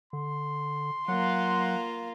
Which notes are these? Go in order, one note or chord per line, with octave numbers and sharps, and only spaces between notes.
D3 C6
F#3 A#3 F4 F#5